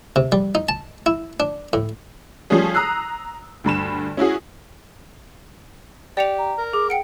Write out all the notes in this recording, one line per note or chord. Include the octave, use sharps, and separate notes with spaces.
C3
G3
D#4
A5
E4
D4
A2
F3 G3 A3 C#4 G#4
A#5 D#6 E6 F#6 C7
D2 G2 B5 E7
C#4 E4 F#4 G#4
G4 D5 C#7 F7
A#5
A#4
G#4 D6
F#5 G5 C#7 D7